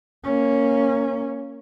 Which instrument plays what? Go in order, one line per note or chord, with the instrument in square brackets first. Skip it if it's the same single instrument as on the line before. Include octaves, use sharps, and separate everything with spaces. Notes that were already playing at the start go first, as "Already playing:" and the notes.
[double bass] A#3 C#4